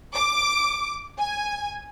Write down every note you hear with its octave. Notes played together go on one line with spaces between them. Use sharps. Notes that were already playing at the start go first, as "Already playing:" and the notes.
D6
G#5